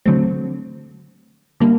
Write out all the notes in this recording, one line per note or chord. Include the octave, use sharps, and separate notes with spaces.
D3 F#3 A3 C4
D3 G3 A#3